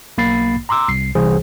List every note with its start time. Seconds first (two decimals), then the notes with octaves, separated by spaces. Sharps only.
0.18 B1 A#3 B5 A6 C7
0.69 A#5 C6 D6 E6
0.88 C2 C7
1.15 C2 E3 G#4 C5